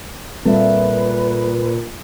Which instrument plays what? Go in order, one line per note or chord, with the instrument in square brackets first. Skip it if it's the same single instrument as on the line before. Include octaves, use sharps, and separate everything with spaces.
[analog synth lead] A#2 [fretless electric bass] G3 C4 [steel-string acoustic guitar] A4 E5 [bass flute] B4